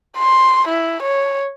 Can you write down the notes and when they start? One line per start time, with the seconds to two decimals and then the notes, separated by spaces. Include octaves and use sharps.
0.18 C6
0.68 E4
1.03 C#5